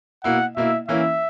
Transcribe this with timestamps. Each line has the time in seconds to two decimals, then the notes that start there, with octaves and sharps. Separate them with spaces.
0.24 B2 A#3 E4 F#5
0.56 B2 A#3 E4 E5
0.88 E3 A#3 C#4 E4 E5